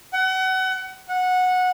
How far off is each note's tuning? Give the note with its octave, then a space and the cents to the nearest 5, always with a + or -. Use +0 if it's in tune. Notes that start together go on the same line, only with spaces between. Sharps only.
F#5 +30
F#5 -15